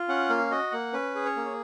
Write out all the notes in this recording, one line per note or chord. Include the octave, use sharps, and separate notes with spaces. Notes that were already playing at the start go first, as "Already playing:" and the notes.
Already playing: F4
C#4 F#5
A#3 F5
F#4 D#5
A#3 F#5
C#4 B4
G#4
C#5
A#3